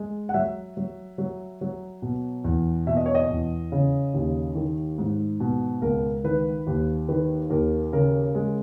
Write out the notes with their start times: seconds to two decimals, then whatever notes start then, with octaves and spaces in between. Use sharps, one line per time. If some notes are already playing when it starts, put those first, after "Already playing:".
Already playing: G#3
0.29 F#5
0.34 F#3 E5
0.77 F#3
1.18 F#3
1.61 F#3
2.02 B2
2.44 E2
2.87 B2 E5
2.97 D#5
3.06 C#5
3.15 D#5
3.29 E2
3.72 C#3
4.14 D#2
4.55 D#3
4.98 G#2
5.40 B2
5.81 C#2 A#4
6.24 D#3 B4
6.67 D#2
7.08 D#3 B4
7.50 D#2 A#4
7.92 C#3 A#4
8.35 G#3